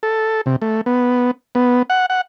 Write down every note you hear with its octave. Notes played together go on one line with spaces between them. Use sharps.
A4
C3
A3
B3
B3
F#5
F#5